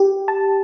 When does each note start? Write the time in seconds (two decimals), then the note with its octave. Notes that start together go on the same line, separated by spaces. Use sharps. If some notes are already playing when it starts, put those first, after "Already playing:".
Already playing: G4
0.28 A5